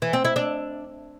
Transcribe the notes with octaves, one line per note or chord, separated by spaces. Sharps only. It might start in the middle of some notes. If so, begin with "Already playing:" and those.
E3
C4
E4
D4